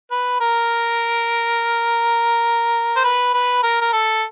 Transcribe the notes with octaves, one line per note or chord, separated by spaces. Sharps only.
B4
A#4
C5
B4
B4
A#4
A#4
A4